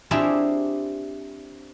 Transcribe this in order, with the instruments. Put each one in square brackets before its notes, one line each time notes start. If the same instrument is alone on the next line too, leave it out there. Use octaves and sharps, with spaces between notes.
[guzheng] C4 D4 E4 F4 G4 G#4